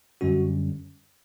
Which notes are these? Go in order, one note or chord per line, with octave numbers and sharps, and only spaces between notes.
F#2 D3 G3 C#4 F#4